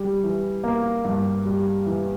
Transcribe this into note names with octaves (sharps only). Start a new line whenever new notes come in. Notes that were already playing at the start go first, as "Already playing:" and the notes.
Already playing: G3
E3
A#3
G2
G3
E3